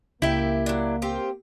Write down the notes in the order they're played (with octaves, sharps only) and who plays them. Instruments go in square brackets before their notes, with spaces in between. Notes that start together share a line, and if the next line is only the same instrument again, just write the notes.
[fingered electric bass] C#2 [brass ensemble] A#3 [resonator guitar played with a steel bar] E4 G4 [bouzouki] E5 G5
[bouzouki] F#3 D4
C4 F4 G4